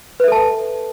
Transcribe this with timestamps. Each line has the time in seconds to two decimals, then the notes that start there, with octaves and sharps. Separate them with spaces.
0.20 B4
0.24 E5
0.28 A4
0.32 A5